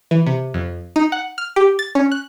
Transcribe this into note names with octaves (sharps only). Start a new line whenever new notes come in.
E3
C3
F2
D#4
F#5
F6
G4
A6
C#4
F#6